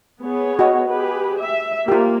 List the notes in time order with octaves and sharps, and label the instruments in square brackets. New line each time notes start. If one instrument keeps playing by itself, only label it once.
[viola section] B3 G#4 C#5
[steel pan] F#4 D#5
[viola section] G4 G#4 B4
E5
[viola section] A#3 [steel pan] F4 G4